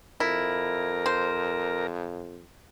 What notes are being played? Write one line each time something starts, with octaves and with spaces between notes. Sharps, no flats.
F2 E4 A#4
C5